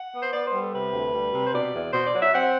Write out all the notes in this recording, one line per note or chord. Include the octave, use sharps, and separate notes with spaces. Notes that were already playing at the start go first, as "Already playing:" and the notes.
Already playing: F#5
B3
C5
B3 D5
C5
G3
A4
C3 B4
D2
G3
C3
C5
B2 D5
E2
B2 C5
D5
F#3
E5
C4 F#5